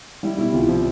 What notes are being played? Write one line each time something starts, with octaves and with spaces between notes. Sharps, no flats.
G3 E4
B2 E4
C2 F4
F3